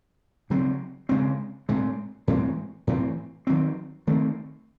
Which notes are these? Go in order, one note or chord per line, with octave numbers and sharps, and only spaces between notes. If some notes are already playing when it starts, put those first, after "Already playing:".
C#3 F#3 C4
C#3 G#3 C4
A2 G#3 C4
A2 E3 G#3 C4
A2 E3 C4
D#3 F#3 C4
D#3 A3 C4